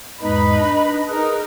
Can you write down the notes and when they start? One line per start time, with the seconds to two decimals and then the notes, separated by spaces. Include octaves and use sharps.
0.22 E2 G#2 G#3 D#4 B4 B5
0.59 D4 D#5
1.09 D#4 G#4 A#4 B4